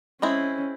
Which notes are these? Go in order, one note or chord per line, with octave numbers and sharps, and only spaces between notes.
G#3 C4 C#4 E4